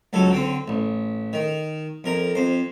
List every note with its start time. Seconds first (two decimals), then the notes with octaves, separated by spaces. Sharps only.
0.13 C#2 F#3 A4
0.31 D3 C4
0.68 A1
1.33 D#3
2.04 F2 A#4 A#5
2.35 F2 C5